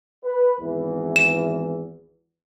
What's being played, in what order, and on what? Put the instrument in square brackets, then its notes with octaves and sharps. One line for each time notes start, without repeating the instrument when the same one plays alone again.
[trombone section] B4
G#1 E2 E3
[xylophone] E7